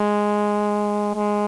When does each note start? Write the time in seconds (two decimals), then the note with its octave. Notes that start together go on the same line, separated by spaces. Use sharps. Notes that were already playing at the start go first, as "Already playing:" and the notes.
Already playing: G#3
1.15 G#3